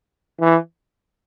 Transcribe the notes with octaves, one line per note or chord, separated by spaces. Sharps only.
E3